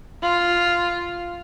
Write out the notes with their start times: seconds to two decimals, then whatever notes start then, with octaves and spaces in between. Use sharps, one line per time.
0.23 F4